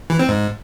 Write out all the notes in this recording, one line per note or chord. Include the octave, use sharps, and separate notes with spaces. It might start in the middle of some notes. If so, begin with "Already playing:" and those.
E3
C4
G#2